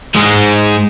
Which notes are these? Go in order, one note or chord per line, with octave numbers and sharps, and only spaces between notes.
G#2 G#3